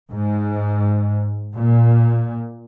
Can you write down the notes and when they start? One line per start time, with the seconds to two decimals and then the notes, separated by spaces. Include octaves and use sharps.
0.12 G#2
1.54 A#2